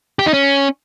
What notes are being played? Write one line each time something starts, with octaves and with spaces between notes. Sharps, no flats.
G4
D#4
C#4